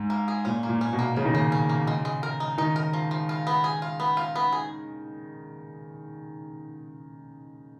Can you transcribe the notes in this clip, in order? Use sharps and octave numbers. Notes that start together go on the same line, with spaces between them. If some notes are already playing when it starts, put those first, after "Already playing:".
Already playing: G#2
A#3
G#4
A#2 C#4
A#3
A#2
C#4
B2
A#3
C#3 A#3
D#3
C#3 A#3
C#4
A#3
G#3
G#3
A#4
D#4
D#3 D#4
A#4
F3
F3
F4
B3
G#4
F4
B3
F4
B3
G#4